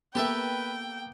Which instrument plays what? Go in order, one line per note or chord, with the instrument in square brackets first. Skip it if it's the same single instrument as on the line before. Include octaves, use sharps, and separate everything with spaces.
[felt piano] A#3 B3 [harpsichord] G4 A4 E5 [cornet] B4 [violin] G5